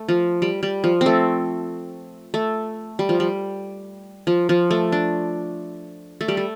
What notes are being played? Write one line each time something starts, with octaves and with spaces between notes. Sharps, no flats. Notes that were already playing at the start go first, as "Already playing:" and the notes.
Already playing: A3
F3
G3
G3
F3
C4
A3
A3
G3
F3
G3
F3
F3
A3
D4
A3
G3
A3